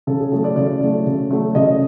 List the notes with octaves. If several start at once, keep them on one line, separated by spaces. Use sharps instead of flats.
C#3 A4
G#4
F#3 A3 A4
D5
C#3 D5
F#3 A3
C#3
F#3 A3
C#3 D#5